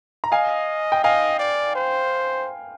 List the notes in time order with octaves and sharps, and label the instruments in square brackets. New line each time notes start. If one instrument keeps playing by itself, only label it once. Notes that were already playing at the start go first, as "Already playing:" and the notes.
[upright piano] A#5
[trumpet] D#5 [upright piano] F5 G#5
[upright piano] G5
[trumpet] D#5 [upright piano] F5 G#5
[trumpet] D5
C5